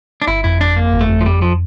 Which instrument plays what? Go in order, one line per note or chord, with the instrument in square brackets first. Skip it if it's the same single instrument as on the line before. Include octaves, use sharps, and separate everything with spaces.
[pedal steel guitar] D4
[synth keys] G1 [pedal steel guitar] E4
[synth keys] F2 [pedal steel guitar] E4
[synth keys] F2 [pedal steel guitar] D4
[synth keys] F2 [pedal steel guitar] A#3
[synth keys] G1
[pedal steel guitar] A3
[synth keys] F2
[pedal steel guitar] F3
[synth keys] F2 [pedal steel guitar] G3
[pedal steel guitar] F3